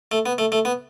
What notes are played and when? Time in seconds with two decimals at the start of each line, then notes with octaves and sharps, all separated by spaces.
0.12 A3
0.26 B3
0.38 A3
0.52 A3
0.65 B3